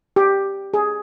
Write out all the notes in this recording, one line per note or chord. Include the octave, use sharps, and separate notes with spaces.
G4
G#4